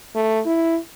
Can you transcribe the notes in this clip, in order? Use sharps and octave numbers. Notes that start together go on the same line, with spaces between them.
A3
E4